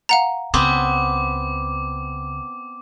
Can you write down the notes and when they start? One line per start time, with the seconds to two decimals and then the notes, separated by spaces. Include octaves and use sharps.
0.09 F5 F#5 A#5
0.54 C#2 C#3 B3 C4 D6